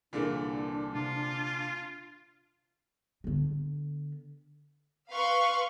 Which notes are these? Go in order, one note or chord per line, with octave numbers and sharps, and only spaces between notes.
C2 A#2 D3 E3 D4 G#4 A#4
C3 F4
D3 B3
B4 F5 C6 C#6